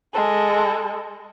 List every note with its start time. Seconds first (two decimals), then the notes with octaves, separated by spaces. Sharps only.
0.13 G#3 A4